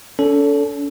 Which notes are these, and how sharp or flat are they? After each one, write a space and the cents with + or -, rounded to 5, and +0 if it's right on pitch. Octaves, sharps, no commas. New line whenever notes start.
C#4 +45 A4 +0